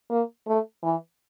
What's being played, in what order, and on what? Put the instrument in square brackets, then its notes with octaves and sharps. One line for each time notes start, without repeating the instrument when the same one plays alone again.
[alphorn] A#3
A3
E3